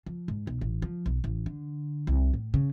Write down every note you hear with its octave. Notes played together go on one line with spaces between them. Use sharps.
F3
G#2
B1
A1
F3
B1
A1
D3
C2
A2
C#3